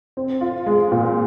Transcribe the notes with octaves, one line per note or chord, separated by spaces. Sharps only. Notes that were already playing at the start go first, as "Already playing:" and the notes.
C4
F4
G#3
A#2